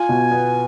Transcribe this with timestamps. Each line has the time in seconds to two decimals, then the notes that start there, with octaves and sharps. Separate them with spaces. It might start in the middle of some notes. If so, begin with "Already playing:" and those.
Already playing: F4 G#5
0.09 B2
0.32 B3